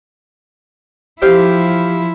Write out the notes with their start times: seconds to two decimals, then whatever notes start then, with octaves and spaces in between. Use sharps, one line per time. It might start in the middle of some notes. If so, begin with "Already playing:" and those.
1.22 F3 E4 G4 C5 F5